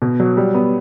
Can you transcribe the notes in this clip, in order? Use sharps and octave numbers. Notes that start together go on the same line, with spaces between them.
B2
F#3
G3
B3